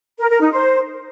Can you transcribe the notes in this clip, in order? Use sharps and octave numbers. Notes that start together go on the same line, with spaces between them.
A#4
A#4
D#4
C5